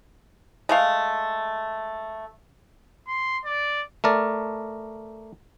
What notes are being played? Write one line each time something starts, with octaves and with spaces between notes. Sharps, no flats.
G#3 A3 F5
C6
D5
A3 A#4 D5